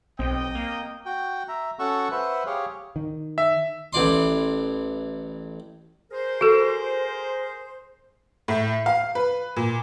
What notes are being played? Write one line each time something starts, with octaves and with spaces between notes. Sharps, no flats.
B1 C4 D#5 G5
A#3
F#4 G5
E5 A#5
C#4 F#4 A4 F#5 C#6 E6
B4 C5 E5 F#5
G4 G#4 C#5 F5
D#3
E5
A1 E3 D5 C6
G#4 A#4 C5
F#4 A4
A2
F5
B4
A#2